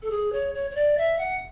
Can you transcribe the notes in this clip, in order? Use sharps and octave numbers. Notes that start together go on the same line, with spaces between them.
A4
G#4
C#5
C#5
C#5
D5
E5
F#5